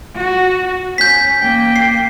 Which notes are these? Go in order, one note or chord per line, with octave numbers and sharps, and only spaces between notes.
F#4
C#4 G6 B6
A#3 G5
C7